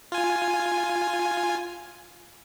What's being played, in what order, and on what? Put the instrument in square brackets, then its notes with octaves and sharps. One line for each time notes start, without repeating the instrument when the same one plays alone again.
[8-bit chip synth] F4 G#5